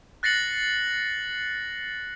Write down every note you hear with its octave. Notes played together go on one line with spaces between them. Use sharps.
F#6 A6 A#6 C7 C#7 F#7